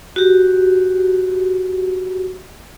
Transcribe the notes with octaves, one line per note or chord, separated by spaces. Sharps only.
F#4 G4